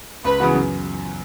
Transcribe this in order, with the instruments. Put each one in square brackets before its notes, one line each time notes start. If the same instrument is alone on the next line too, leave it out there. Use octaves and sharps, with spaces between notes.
[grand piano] C#2 [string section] B4
[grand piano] C#3 E3 B3 F#4
F#2